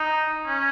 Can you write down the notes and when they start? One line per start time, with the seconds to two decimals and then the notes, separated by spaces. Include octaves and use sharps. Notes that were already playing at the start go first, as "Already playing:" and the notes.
Already playing: D#4
0.46 C#4